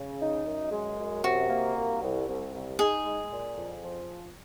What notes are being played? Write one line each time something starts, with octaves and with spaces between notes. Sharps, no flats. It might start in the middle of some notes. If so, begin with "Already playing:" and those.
Already playing: C#3
D#4
F#2
G#3
F#2
C3 F#4
A#3
C2
C2
C2
C2
D#4 G#4
G#3
A#2
F2
F3